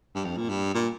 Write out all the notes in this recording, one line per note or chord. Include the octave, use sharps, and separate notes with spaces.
G2
F2
A#2
G2
A#2